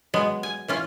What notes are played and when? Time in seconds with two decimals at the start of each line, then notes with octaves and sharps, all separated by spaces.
0.14 F#3 G#3 B3
0.43 G#5
0.68 E3 C#4 F4